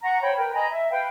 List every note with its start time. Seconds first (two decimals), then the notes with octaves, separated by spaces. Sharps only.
0.03 F#5 A#5 C#6
0.21 C5 C#5 G5 B5
0.37 A#4 B4 G5
0.53 D#5 G#5 A#5 B5
0.69 E5
0.91 B4 F5 G5